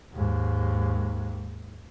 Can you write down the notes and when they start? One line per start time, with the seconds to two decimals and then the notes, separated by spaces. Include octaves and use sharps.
0.12 D#2 G#2